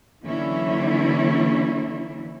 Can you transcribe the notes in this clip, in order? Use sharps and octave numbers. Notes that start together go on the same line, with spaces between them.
D3 E3 F#3 A#3 C#4 E4